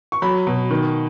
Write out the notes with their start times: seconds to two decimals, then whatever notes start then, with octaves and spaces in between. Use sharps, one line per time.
0.12 C#6
0.22 F#3 B5
0.47 B2
0.71 D#3